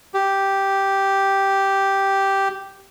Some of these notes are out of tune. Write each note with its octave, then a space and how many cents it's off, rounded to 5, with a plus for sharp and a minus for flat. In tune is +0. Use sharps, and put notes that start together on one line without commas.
G4 -5